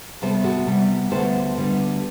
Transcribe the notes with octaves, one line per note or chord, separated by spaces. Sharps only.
C3 G3 B3 A4 C5
F#4 A4
C3 G3 B3
D2 D3 G3 B3 A4 C5
D2 D3 G3 B3